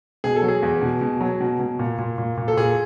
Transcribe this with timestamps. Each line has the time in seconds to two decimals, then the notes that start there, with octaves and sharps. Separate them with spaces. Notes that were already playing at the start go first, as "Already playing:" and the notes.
0.24 B2 G#4
0.36 A4
0.43 F#3
0.48 G#4
0.63 E2
0.81 B2
1.01 B2
1.21 F#3
1.40 B2
1.59 B2
1.79 A#2
1.99 A#2
2.18 A#2
2.37 A#2
2.48 A4
2.57 A#2 G#4